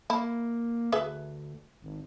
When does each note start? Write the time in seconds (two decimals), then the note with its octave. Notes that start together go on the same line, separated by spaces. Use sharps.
0.10 A#3 E4
0.92 D2 G#4 B4 E5
1.82 G#1